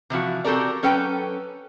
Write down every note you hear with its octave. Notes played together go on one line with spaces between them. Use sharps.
C3 E3 F3 F#4
C4 F#4 G4 A4 A#4 D5
F#3 C#4 A4 B4 G5